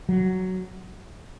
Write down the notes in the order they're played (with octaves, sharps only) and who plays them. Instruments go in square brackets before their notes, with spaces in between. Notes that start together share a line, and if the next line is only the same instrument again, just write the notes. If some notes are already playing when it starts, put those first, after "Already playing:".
[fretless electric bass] F#3